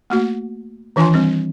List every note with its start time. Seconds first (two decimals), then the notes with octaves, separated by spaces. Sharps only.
0.10 A3 A#3 F#4
0.96 D#3 E3 D4 F4 G#5 C6
1.14 G3 C4